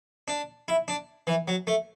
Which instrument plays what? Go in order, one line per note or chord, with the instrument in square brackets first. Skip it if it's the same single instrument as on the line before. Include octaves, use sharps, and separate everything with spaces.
[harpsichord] D4
E4
D4
E3
F#3
A3